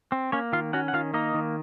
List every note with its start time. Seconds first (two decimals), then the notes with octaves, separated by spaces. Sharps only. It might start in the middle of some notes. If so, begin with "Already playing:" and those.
0.12 C4
0.32 A#3 C#4 C#5
0.52 D#3 F4 F5
0.73 C#4 F#4 F#5
0.88 F#5
0.93 D#3 F4 F5
1.14 A#3 D#4 D#5
1.34 D#3